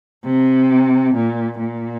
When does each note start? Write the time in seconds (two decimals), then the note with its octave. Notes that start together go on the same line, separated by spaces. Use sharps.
0.25 C3
1.15 A#2
1.59 A#2